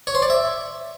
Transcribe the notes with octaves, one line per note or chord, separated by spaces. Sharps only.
C#5
C5
D5
E5